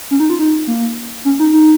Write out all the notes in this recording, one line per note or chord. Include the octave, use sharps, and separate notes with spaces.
C#4
D#4
F4
D#4
A#3
C#4
D#4
D#4